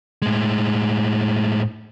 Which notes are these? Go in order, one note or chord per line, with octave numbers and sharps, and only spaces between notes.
A2 G#3